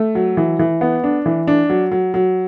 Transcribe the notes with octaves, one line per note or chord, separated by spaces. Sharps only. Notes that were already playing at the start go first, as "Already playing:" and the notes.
Already playing: A3
F#3
E3
E3
B3
D4
E3
D4
F#3
F#3
F#3